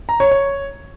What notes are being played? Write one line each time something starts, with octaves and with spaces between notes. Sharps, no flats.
A#5
C#5
C#5